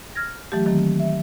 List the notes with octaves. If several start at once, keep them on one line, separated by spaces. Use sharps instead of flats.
F6 G#6 A#6
E3 F#3 A3 G4
D#3 F#3 A#3 C4
E5